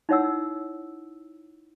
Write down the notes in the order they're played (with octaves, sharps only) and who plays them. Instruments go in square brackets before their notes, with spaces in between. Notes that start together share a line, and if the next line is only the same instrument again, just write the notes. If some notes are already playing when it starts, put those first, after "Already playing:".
[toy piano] D#4 E4 C#5 F#5 E6